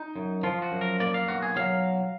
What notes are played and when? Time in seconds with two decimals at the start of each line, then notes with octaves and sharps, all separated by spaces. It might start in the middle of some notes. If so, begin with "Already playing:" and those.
Already playing: D#4
0.16 F#2
0.43 F3 F4
0.62 F#4
0.72 F#2
0.81 A#4
1.00 A#3 D5
1.14 F5
1.28 B1 F#4
1.42 G#4
1.56 F#3 F5